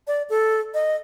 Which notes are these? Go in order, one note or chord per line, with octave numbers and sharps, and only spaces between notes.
D5
A4
D#5